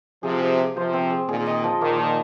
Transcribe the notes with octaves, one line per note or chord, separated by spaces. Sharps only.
C3 F3 G#4
G#4
G#4
C3 F3 C5
C4
G#4
A#2 D#3 G#4
D#5
F3
A#2 D#3 A#3
F3